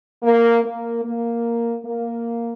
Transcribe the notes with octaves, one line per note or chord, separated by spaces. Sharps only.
A#3
A#3
A#3
A#3